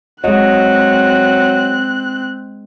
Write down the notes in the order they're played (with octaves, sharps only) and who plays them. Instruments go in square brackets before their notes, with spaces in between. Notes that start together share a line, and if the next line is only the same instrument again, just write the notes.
[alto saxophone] F#3 [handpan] G#3 D#5 [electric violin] C4 F#6